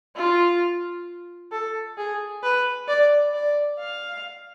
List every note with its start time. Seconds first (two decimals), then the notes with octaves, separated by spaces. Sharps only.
0.16 F4
1.52 A4
1.98 G#4
2.43 B4
2.88 D5
3.34 D5
3.79 F5